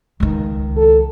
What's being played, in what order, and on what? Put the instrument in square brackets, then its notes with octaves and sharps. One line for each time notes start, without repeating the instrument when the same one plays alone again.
[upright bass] C#2 D#3
[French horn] A4